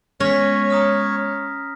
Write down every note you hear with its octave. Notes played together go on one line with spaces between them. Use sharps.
G#3 B3 C#4 C#5 A#6 B6
A#5 D#6 F6